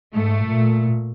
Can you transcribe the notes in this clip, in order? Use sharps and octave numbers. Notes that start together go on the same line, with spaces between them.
G#2 A3
A#2